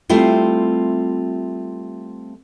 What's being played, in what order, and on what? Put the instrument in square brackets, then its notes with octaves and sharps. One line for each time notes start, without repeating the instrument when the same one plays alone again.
[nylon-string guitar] G3 A3 C4 E4 F4